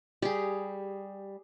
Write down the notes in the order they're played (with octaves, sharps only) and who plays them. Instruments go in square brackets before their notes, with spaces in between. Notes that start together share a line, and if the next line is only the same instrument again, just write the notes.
[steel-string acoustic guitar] G3 [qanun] G4 G#4